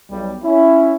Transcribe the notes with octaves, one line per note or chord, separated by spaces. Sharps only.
B1 G3
C#4 E4